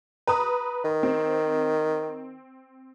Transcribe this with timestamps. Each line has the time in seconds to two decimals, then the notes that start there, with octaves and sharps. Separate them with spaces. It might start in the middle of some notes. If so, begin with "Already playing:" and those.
0.27 B4 A#5 D#6
0.85 D#3
1.03 C4